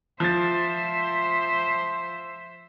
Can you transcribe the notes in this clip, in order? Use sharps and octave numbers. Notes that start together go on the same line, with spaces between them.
F3 C5 E5 A6